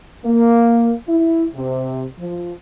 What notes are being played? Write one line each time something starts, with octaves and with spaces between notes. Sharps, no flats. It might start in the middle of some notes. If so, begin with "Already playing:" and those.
A#3
E4
C3
F3